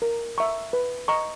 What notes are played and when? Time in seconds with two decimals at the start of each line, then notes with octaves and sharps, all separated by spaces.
0.02 A#4
0.38 E5 A#5 C#6
0.73 B4
1.08 D#5 A#5 C#6